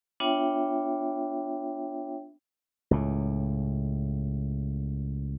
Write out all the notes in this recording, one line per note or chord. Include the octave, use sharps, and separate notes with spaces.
B3 D4 F4 C#5 E5 G5
C#2 A2